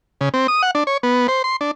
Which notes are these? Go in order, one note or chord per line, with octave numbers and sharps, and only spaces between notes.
C#3
C4
D#6
F#5
D4
C#5
B3
C5
C6
D4